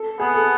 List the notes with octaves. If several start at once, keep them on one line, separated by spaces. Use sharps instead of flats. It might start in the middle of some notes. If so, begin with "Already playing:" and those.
Already playing: A4
B3 G#4
A4